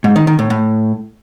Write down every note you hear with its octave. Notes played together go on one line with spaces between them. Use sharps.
G#2
D#3
D#3
A2
A2